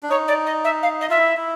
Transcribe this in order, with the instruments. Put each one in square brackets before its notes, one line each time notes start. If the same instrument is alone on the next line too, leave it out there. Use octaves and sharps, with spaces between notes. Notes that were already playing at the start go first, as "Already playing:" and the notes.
[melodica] D4
[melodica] D#4 [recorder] C#5
[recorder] D5
D#5
E5
F5
D#5
[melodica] F4 [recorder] E5
[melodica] E4
E4